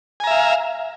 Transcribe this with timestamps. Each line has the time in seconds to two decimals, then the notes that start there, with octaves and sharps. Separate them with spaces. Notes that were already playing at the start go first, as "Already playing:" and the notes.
0.20 G#5
0.24 A#5
0.27 E5
0.31 F5